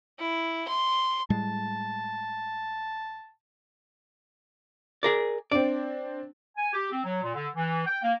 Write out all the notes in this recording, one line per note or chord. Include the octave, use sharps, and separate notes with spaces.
E4
C6
A2 G3 G#3 A5
G#4 A#4 D5
C4 D4 D5
G#5
G4
C4
F#3
A#2
D3
E3
G5
A#3